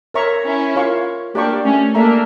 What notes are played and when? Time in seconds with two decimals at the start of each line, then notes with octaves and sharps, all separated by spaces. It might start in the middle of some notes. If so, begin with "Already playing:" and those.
0.14 A#4 C#5 E5 A#5 C#6
0.45 C#4 E4
0.75 F4 A#4 C#5 F5 C#6
1.35 A#3 D4 G4 A#4 D5 G5 C#6
1.64 A3 C#4
1.95 A#3 D4 A4 E5 A#5